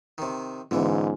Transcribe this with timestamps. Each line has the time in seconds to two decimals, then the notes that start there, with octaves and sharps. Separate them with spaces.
0.18 C3 D#3
0.71 G#2 D3 E3 B3 C#4 F4